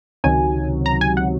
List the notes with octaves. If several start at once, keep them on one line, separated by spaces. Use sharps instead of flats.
C#2 C3 D#3 F#3 G#5
A#5
G#5
F#5